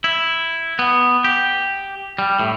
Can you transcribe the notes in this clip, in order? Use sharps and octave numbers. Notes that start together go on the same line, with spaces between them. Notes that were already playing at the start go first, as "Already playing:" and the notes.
E4
B3
G4
G3
A2